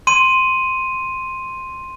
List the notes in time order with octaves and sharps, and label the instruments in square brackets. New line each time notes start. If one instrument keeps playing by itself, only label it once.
[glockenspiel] C6 D#7